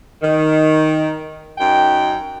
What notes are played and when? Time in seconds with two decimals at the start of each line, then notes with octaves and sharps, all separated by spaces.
0.22 D#3
1.58 F#2 D#4 G5